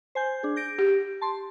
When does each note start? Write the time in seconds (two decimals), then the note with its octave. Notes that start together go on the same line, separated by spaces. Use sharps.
0.15 C5 G#5 G6
0.43 D4 G#4
0.56 G6 A#6 D7
0.78 G4
1.21 A5 C6